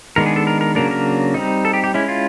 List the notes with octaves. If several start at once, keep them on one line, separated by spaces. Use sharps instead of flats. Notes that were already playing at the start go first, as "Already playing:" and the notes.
D#3 G#3 B3 D4 A#4
G#4
A4
A#4
A#4
C#3 F#3 A#3 D4 A#4
A#4
G3 C4 D#4
A4
G4
G4
G#3 C#4 E4
F4